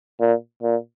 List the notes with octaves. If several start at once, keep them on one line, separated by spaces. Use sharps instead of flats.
A#2
A#2